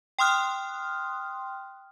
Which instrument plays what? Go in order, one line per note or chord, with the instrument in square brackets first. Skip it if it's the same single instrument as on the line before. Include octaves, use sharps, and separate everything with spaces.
[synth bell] G5 C6 D#6 F6 F#6